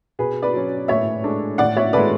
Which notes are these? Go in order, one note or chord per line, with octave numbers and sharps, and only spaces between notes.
B2 G#4 B4
B4 D5
F#3 C#4
A2 C#5 E5
G#3 D4 A4
A2 D5 F#5
C#5 E5
G#3 C#4 E4 A4 B4 D5